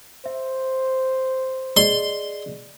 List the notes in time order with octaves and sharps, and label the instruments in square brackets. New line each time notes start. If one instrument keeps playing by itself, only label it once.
[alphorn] C5 [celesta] E5
[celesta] G#4 D5 D#5 [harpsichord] C6